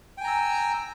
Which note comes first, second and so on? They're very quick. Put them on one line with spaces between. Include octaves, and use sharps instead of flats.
G5 G#5 A#5 E6